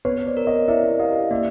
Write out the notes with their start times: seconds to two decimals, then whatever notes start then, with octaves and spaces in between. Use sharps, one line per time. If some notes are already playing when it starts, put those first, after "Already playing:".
0.05 B3 B4 C#5
0.26 C5 D5
0.37 A#4
0.47 C#5 D#5
0.68 E4 D5 E5
0.99 G4 D#5 F5
1.30 A#3 D5 E5